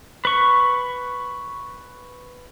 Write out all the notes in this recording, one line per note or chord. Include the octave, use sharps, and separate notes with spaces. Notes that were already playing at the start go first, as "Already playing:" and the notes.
B4 C#6